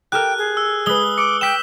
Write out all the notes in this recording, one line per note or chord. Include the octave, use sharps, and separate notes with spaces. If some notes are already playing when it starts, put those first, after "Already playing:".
G4 A4 A#4 G5 F6 F#6
G#4
E6
G#3 B4 D#6 G7
D6 C#7
G5 D6 E6 G6 B6 E7